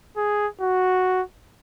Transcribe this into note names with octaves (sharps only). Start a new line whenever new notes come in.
G#4
F#4